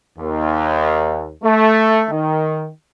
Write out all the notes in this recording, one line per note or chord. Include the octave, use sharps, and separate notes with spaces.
D#2
A3
D#3